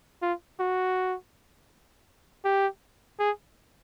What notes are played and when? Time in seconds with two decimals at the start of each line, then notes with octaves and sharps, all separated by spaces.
0.22 F4
0.60 F#4
2.45 G4
3.19 G#4